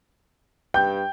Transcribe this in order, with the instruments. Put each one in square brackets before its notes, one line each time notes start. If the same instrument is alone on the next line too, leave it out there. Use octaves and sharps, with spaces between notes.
[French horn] G2 [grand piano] G5 [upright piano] G6